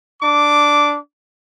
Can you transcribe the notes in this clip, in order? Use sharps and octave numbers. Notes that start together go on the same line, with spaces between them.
D4 D6